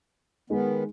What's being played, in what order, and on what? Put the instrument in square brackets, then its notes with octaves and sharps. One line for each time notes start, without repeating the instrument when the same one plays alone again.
[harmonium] D#3 B3 [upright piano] G#3 D#4